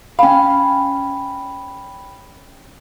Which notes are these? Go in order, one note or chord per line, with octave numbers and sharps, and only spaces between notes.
C#4 F5 G5 B5